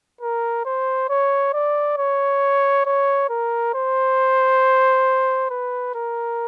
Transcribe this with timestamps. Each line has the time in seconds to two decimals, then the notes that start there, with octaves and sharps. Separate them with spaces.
0.21 A#4
0.66 C5
1.09 C#5
1.54 D5
1.98 C#5
2.86 C#5
3.30 A#4
3.74 C5
5.50 B4
5.95 A#4